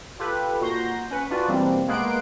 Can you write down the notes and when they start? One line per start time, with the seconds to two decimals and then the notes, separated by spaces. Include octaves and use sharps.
0.20 F4 G4 A4 B4
0.61 A#2 F#4 A#5 C6 G6 A#6
1.11 C#4 B4 F#5
1.31 D4 F4 F#4 B4 D5
1.48 B2 E3 G3 A#3 C4 D4
1.88 G#3 A#3 B3 C6 F#6 D7